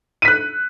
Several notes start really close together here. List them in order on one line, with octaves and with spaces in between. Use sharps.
D#7 B6 F#6